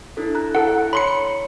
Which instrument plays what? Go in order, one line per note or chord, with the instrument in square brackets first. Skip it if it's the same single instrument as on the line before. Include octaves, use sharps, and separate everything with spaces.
[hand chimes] D4 E4 A4
A#5 F#6
[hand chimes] E4 [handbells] A4 F#5
[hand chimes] A#5
[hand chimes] C#5 [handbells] B5 C6 C#7
[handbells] C#7